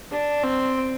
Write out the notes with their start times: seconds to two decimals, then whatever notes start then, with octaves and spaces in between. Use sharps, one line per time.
0.11 D4
0.44 C4